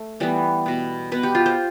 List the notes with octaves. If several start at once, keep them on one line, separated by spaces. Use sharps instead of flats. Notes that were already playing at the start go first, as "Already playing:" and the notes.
Already playing: A3
E3 G3 B3
B2 B3
B2 B3 B4
G4
F4
C5